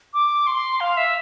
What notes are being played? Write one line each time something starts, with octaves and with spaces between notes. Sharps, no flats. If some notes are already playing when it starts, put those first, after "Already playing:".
D6
C6
F5
E5